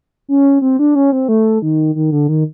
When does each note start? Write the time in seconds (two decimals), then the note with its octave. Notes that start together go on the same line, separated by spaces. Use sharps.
0.29 C#4
0.62 C4
0.79 D4
0.95 C#4
1.12 C4
1.28 A3
1.62 D#3
1.95 D#3
2.12 D3
2.29 D#3